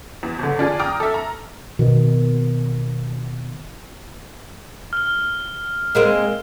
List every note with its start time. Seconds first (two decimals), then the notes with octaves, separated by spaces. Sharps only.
0.23 E2
0.39 G1 D3
0.59 D4 F4 G#4
0.79 G5 A#5 D6 D#6 F6
1.00 A4 E5
1.14 A#5
1.79 B2 D#3
4.93 F6 G7
5.95 G#3 A#3 C4